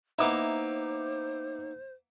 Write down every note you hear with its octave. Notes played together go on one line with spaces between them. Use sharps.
A#3 B3 D#4 E4 C5 E5 D6